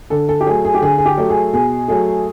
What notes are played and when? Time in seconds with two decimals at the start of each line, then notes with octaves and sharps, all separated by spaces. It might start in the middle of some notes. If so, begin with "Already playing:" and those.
0.10 D3 A4
0.29 A4
0.41 G4
0.47 F#3 A3 G#4
0.65 G#4
0.74 G4
0.82 D3 G#4
0.98 G#4
1.06 G4
1.17 F#3 A3
1.30 G#4
1.53 B2 G#4
1.88 F#3 A3 G#4